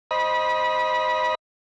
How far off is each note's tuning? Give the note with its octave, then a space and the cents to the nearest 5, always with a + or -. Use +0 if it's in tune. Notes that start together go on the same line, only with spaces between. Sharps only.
C5 +0 D#5 +0 B5 -25